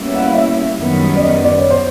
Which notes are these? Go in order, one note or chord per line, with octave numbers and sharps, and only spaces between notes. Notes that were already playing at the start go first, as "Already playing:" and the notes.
Already playing: B2 G3 A#3 C#4 E4
F#5
F5
E5
F#2 D#3 G3 B3
D5
D#5
D5
C#5
C5